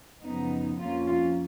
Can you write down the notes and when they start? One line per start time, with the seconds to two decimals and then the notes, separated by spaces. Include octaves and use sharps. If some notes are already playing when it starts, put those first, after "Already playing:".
0.21 F#2 C#3 F3 B3 D#4
0.78 F2 F3 A#3 C#4 F4
1.07 F4